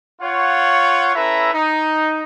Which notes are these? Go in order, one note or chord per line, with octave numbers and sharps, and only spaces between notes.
F4 C#5 F#5
C#4 E4 A4 B4 E5 A#5
D#4